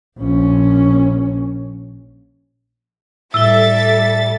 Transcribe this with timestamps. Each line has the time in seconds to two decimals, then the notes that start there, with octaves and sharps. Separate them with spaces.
0.18 A#1 C#4
3.34 A2 G3 A4 E5 E6 A6 G7